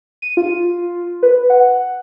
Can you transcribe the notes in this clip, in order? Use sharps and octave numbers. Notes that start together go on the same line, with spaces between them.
D#7
F4
B4
F#5